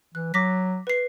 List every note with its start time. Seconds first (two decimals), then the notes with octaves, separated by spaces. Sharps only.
0.15 E3 F#6
0.34 F#3 D6 A#6 B6
0.87 B4 C7